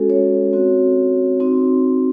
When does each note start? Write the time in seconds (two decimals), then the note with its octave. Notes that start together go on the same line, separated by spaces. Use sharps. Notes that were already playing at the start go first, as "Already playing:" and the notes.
Already playing: G#3 C#4 F#4 A4
0.10 C#5
0.53 C4 F#4
1.40 C4 D#4 F#4